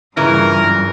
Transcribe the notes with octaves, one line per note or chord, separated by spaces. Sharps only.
G2 A#2 C#3 E3 A#4